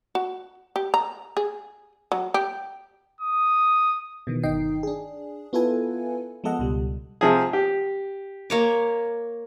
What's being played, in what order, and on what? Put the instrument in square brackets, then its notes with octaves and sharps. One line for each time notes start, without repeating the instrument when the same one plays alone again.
[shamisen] F#4
G4
A#5
G#4
F#3
G4
[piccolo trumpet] D#6
[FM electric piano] B2 D#3 E3
G1 D#3 D#4 D#5 G5 C7
D4 G#4
B3 E4 F4 A4 B4 G#5
F3 G#3 B3 A4 D#5 F#5
C#2 B2 G3
[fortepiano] C3 F3 G#4
G4
[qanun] A#3 C#5 D6